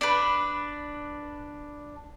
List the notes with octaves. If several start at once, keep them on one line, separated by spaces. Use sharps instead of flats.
D4 B4